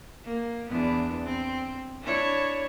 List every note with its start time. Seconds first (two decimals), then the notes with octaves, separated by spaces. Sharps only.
0.24 A#3
0.69 E2 B3 D4
1.23 C4
2.03 D4 E4 C#5